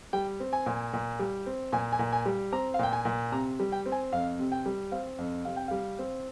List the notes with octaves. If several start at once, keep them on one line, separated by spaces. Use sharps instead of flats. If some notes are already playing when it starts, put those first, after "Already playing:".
G3 G5
C4
G#5
A#2
A#2
G3
C4
A#2 G#5
G#5
A#2
G#5
G3
C4 A#5
F5
A#2 G5
G#5
A#2
C3 A#5
G3
G5
C4
G#5
F2 F5
C3
G5
G3
C4 F5
F2
C3 F5
G5
G3 F5
C4